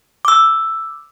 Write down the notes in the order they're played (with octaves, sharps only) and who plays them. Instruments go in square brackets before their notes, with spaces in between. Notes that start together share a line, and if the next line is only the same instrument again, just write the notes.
[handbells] D6 E6